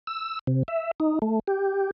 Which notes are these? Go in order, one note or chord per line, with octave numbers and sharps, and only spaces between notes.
E6
C3
E5
D#4
A3
G4